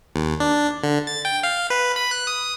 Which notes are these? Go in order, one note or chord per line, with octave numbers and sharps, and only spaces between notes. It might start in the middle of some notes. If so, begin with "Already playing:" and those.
D#2
D4
D3
A6
G5
F5
B4
B5
F#6
D#6